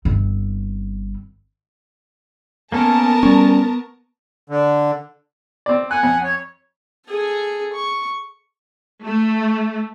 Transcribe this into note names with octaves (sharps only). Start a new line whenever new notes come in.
G1 C4
A#3 B3 C#4 A4 A#4 A5
G3 C#4 C#6
D3
C4 D5
F#5 G#5 F#6
F2
C#5
G#4 A4
C#6
A3